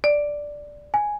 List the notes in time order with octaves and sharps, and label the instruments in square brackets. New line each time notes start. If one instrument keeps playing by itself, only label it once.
[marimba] D5
[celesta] G#5